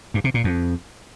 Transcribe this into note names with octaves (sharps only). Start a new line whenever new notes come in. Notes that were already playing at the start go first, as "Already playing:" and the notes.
G2
C3
A#2
F2